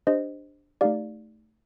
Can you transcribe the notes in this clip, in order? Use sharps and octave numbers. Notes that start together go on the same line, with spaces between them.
D4 G4 C5 D#5
A3 D#4 G4 D5 F5